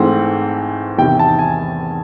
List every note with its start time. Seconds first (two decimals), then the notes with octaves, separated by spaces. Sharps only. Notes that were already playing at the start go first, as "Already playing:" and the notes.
Already playing: G#2 E3 A3 C4 F#5
0.98 E2 C3 D#3 G5
1.19 A5
1.39 G#5